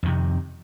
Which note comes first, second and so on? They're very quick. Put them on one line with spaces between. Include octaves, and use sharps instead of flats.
F2 D#3 C3